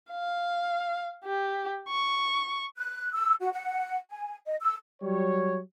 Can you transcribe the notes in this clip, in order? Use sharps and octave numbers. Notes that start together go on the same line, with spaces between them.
F5
G4
C#6
F#6
E6
F#4
F#5
G#5
D#5
E6
F#3 G3 C#5